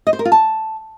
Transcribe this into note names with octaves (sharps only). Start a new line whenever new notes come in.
D#5
C5
A#4
F4
A5